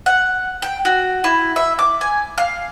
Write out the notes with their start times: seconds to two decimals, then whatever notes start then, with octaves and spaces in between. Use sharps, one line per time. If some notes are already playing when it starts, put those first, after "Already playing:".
0.06 F#5
0.62 G5
0.85 F#4
1.24 E4
1.56 E5
1.79 D6
2.01 G#5
2.38 F5